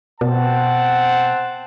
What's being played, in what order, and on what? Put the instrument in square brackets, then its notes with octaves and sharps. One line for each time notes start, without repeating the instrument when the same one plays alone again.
[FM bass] B2 [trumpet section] C4 F#5 A5